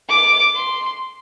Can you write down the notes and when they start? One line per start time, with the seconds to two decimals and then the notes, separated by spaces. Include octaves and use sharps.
0.09 D6
0.55 C6